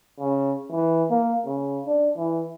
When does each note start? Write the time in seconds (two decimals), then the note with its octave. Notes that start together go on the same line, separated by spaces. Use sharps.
0.20 C#3
0.71 E3
1.10 A#3
1.45 C#3
1.86 D4
2.17 E3